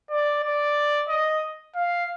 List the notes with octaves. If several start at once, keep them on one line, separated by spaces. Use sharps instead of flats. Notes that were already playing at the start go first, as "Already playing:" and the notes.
D5
D5
D#5
F5